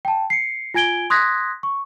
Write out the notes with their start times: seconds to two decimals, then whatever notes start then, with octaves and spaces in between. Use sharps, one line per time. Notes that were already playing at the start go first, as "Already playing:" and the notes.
0.05 G5 A5
0.30 C7 C#7
0.74 F4 G#5 G#6 D7 G7
1.10 C6 D#6 F#6 G#6 A#6 B6
1.63 C#6